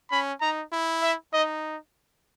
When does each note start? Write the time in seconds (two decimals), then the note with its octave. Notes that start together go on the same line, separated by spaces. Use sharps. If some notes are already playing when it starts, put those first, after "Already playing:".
0.11 C#4 B5
0.41 D#4 A#5
0.72 E4
1.02 E5
1.34 D#4 D#5